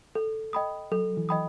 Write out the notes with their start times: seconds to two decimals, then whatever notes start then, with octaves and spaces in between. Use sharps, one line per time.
0.15 A4
0.53 D#5 G5 B5 D#6
0.91 F#3 A4
1.17 E3
1.29 D#5 G5 B5 D#6